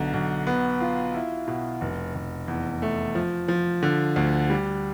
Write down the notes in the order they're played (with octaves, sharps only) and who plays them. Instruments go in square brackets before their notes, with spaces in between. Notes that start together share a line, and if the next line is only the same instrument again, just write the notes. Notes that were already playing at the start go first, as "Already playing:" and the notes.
Already playing: [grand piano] B1 D3
B1
B3
F4
E4
B2
F1
F1
E2
A3
F3
F3
D3
D2
G3